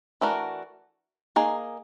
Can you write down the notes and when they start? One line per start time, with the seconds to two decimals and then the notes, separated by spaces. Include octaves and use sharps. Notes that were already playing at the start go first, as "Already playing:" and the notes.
0.21 E3 A3 D4 F#4 A#4
1.36 A#3 D#4 G#4